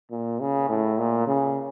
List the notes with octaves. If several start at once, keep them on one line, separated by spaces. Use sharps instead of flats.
A#2
C#3
A2
A#2
C#3